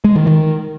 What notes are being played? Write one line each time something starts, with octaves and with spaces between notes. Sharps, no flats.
G#3
D#3
D#3